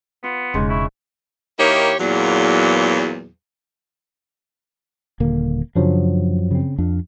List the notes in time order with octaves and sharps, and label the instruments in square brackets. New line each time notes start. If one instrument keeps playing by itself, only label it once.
[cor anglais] B3 [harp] F4
[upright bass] E1 [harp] G#2 C#3 [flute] C6
[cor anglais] E4 [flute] C#6
[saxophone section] D#3 A#3 D#4 E4 G4 C#5
E2 A#2 F#3
[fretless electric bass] D#1 D3 A#3
[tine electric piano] F#2 F3 F#3 [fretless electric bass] C#3 D4
[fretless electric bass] C#3 C4
F2 D4